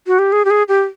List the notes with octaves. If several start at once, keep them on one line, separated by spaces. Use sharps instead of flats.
F#4
G4
G#4
G4
G#4
G4